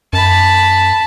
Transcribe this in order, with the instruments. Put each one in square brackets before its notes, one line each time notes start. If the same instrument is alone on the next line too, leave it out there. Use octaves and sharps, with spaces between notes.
[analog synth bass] F#2 [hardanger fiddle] A5 B5